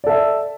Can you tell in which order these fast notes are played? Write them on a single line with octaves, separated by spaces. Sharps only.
D5 A4 E5